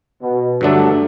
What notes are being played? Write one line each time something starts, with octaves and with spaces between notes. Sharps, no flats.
B2
G2 D3 F#3 A3 D4 A4